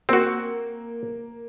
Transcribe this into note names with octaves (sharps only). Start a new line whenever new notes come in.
A#3 C4 F#4